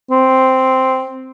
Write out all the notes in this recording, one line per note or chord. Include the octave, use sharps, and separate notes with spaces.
C4